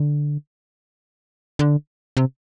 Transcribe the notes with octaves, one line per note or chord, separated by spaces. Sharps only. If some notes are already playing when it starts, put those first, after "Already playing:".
Already playing: D3
D3
C3